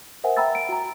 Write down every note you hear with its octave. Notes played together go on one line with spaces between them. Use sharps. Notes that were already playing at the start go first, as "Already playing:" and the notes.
A#4 C5 E5 F#5 G#5
E5 G5 A#5 B5 E6 A6
D7
F#4 A#5